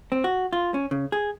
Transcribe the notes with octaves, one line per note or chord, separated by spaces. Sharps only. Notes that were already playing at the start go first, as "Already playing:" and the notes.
C4
F#4
F4
C#4
C#3
G#4